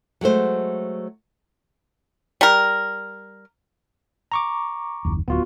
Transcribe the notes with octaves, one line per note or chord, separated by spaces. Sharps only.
F#3 G#3 A3 C5
G3 A#4
A#5 C#6 D6
F#1 D#2
D1 B3 F4 F#4